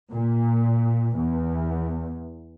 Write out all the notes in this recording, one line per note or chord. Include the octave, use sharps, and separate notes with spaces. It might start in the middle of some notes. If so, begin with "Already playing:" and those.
A#2
E2